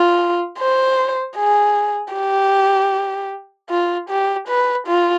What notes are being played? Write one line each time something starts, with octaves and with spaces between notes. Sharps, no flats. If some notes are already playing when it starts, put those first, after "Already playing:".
Already playing: F4
C5
G#4
G4
F4
G4
B4
F4